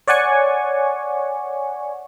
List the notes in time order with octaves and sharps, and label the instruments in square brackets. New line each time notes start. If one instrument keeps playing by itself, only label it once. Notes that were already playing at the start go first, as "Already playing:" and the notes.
[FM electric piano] C#5 D5 F#5 G#5 C#6